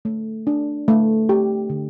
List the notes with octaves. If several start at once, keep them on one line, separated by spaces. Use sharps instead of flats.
A3
D4
A3
G4
D3